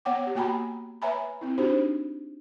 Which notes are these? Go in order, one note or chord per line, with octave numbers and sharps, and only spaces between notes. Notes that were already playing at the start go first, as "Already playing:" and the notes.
B3 C#5 F#5 G5 D6
G4 C#5
A#3 F#4 G5 G#5 A#5 B5
B4 C#5 E5 G#5 A#5 B5
C4 E4
D4 D#4 F#4 G4 C5